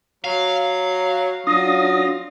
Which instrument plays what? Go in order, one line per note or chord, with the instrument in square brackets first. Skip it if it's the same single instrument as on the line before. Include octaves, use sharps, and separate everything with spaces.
[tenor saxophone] F#3 [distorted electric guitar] F5
[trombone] F#3 [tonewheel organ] D4 D#6 A#6 [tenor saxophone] F4